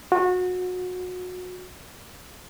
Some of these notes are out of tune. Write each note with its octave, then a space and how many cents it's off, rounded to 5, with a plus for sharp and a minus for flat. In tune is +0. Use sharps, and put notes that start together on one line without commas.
F#4 -25